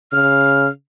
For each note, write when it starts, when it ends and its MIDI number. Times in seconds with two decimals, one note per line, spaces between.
0.12 0.68 49
0.12 0.68 89